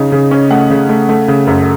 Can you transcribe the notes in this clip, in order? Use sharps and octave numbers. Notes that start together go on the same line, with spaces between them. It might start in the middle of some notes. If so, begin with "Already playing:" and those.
Already playing: C#3 D#4
C#3
C#4
A3 F#5
C#3
A3
A3
C#3
F#2